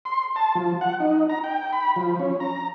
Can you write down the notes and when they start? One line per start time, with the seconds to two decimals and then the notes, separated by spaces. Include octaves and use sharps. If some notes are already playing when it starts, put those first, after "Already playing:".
0.05 C6
0.36 A5
0.55 F3
0.81 F#5
1.00 D#4
1.29 A#5
1.44 G5
1.73 B5
1.96 F3
2.19 C#4
2.40 A#5